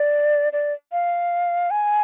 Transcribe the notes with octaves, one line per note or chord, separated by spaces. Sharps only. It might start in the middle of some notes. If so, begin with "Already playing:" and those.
Already playing: D5
D5
F5
G#5